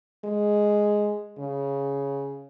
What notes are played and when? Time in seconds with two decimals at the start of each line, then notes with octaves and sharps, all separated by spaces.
0.25 G#3
1.39 C#3